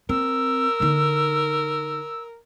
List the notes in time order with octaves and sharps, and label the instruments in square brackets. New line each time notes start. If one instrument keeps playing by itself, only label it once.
[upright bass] C4 [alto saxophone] A#4 [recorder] E6
[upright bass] D3 D#4